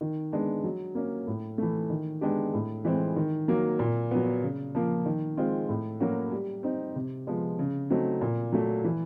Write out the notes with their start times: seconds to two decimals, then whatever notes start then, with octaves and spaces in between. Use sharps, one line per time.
0.01 D#3
0.32 G#3 B3 D4
0.64 F#3
0.95 A#3 C#4
1.27 A2
1.58 E3 A3
1.90 D#3
2.21 G#3 B3 D4 G4
2.54 A2
2.85 E3 G#3 C4
3.16 D#3
3.48 F#3 A#3
3.79 A#2
4.11 F#3 B3
4.42 C#3
4.75 F3 A#3
5.06 D#3
5.37 G#3 C4 F4
5.69 A2
6.00 F#3 A#3 C#4 F#4
6.32 G3
6.63 C4 D#4
6.96 C3
7.27 F3 G#3 B3
7.59 C#3
7.90 F#3 A3 C4 D#4
8.21 A#2
8.52 F#3 A3
8.84 E3